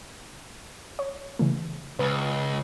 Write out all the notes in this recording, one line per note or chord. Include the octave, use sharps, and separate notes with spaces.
C#5
C#3 E3 A3
C#2 B4